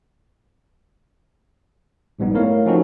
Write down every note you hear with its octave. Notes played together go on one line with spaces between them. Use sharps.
A#1 G#2 G3 B3 D#4
A3 A#3 E4 A#4 C#5 F5
F3 C4 C#4 D#4 F#4 A4